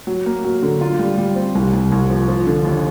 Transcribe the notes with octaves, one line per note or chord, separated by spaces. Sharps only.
F#3
A#3
F#3
D3
F4
G3
G3
C4
C2
C2
C2
F3
F3
D3
D#2